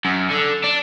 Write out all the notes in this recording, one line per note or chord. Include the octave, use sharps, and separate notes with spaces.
F#2
D3
D4